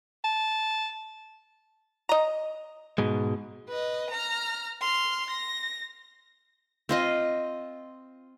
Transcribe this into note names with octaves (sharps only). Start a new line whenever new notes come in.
A5
D#5 A#5
G#2 B2 G#3
B4 D#5
A#5 F6
C6 F6
A#6
C4 F4 D#5